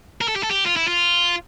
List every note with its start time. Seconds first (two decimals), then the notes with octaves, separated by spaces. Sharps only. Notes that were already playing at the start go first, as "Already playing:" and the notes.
0.21 A#4
0.28 A4
0.36 G4
0.43 A4
0.51 G4
0.66 F4
0.76 E4
0.88 F4